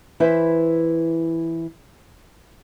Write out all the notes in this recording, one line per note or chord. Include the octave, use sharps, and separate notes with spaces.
E3 E4 B4 C5 E5